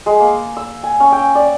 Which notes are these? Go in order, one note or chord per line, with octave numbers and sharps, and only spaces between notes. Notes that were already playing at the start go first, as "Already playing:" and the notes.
G#3
A#3
E6
G#5
C#4
G5
D5